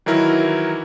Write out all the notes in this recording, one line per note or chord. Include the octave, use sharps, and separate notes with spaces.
D#3 E3 F#3 E4 A#4